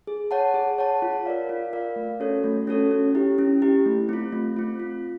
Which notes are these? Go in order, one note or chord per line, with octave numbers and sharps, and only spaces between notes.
G#4
C#5 F#5 A5
G#4
C#5 F#5 A5
F4
A#4 D5 F5
F4
A#4 D5 F5
A3
C#4 F#4 A4 C#5
A3
C#4 F#4 A4 C#5
C#4
E4 G4
C#4
E4 G4
A3
C4 F4
A3
C4 F4
F4